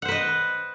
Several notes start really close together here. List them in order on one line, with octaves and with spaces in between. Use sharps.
F#5 C5 B4 D#5